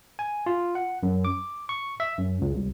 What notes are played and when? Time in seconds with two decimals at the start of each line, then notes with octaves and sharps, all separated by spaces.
0.19 G#5
0.46 F4
0.75 F#5
1.03 F#2
1.25 D6
1.69 C#6
2.00 E5
2.18 F#2
2.41 C#2
2.55 C2